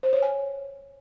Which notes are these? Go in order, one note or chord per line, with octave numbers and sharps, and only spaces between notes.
C5
C#5
G#5